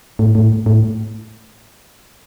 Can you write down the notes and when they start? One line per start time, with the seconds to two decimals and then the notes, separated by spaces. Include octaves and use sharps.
0.19 A2
0.35 A2
0.66 A2